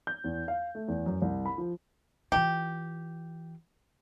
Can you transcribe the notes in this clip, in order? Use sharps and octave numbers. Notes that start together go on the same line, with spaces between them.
G6
E2
F5
A3
E2
F#2
C2
B5
F3
E3 F4 G4